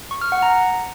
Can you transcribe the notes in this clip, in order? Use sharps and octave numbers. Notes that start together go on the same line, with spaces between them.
C#6
F6
F#5
A#5